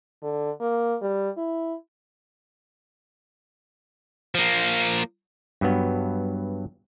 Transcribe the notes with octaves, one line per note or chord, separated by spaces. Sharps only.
D3
A#3
G3
E4
F3 A#3
G2 F#3 B3